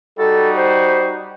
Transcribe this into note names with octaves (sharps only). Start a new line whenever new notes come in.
G3 D#4 F#4 A4
C5